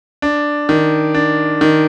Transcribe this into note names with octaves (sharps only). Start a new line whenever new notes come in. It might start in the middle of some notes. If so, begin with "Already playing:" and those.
D4
D#3
D4
D#3